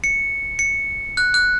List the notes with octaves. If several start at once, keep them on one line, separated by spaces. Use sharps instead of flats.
C#7
C#7
F#6
F#6